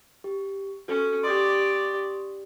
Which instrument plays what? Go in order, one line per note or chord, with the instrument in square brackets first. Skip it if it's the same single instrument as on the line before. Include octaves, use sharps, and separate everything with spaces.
[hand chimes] G4
[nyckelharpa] C#4 [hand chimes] F#4 A4
[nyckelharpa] G4 D5 [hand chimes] C6 C#6 D#6